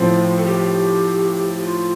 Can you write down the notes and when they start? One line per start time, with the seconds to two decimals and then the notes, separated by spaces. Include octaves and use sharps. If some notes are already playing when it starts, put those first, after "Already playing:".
Already playing: A2 F3 C4 F4
0.36 A4
0.46 G4
1.63 F4